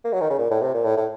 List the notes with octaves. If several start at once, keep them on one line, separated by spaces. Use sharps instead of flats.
A#3
F#3
D#3
C#3
A#2
A2
C3
A#2
A2
A2